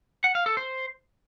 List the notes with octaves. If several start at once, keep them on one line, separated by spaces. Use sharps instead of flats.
F#5
F5
A4
C5